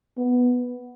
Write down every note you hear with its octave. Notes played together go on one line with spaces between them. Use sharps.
B3